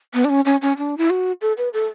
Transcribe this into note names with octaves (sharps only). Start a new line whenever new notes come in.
B3
D4
C#4
C#4
C#4
D4
E4
F#4
A4
B4
A4